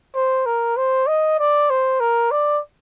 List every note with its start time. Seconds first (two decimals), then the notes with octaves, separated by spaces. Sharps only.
0.15 C5
0.46 A#4
0.77 C5
1.07 D#5
1.39 D5
1.70 C5
2.00 A#4
2.31 D5